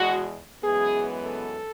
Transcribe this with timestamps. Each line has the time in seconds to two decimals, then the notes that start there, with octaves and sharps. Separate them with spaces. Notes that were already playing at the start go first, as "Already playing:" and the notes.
Already playing: E2 B2 G#3 F#4
0.63 F#2 E3 G#3 B3 G#4
1.24 A4